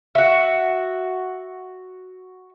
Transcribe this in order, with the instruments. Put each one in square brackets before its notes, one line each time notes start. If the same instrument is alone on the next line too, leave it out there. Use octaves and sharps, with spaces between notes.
[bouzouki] F#4 E5